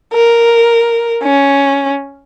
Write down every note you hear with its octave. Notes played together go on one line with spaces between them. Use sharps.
A#4
C#4